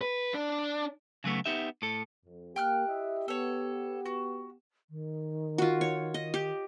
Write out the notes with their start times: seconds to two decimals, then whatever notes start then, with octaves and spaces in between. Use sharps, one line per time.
0.01 B4
0.34 D4
1.24 C#3 F#3 A3 B3
1.46 B3 D#4 G4 E5
1.82 A2 A4
2.26 F2
2.56 A#3 G4 G5 F6 F#6
2.87 E4 D#5 E5
3.28 B3 A4 C#5
4.06 F#4
4.90 D#3
5.58 F4 F#4
5.81 C#5
6.14 D#5
6.34 G4